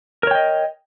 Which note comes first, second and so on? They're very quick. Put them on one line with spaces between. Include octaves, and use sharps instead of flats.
A#4 C#5 G5 D#5